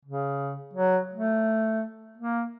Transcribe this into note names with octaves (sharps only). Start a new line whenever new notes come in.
C#3
F#3
A3
A#3